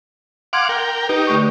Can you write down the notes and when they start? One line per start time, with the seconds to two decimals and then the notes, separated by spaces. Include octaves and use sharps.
0.53 F5 F#5 C6 D6 G#6
0.69 A#4 G5
1.09 D#4 G4 B4
1.27 D3 A3 C#6